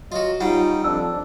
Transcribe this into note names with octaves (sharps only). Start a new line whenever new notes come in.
F#3 F4 F#4 D#5
G3 C#4 D#4 F4 F#5
F2 D4 E6